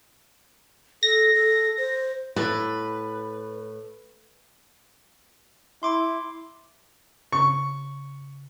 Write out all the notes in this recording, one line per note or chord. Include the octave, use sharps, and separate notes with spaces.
A4 A#6
A4
C5
A2 B4
E4 C6 D6
C#3 C#6